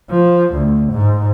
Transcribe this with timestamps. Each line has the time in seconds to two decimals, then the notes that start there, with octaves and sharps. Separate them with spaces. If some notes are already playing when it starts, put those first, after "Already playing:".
0.11 F3
0.53 D2
0.92 G#2